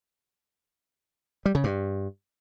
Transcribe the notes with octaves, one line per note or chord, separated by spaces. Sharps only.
G3
C#3
G2